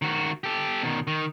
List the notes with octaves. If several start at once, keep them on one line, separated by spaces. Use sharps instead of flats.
D#3 F#4
G4 A4
B2 D#3
D#3